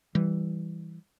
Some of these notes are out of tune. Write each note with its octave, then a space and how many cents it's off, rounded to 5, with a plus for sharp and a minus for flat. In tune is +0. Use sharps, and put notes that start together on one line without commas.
E3 +0 G3 +0